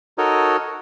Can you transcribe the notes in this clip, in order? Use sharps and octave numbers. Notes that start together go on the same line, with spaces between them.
D#4 F#4 A4 A#4 C#5 D#5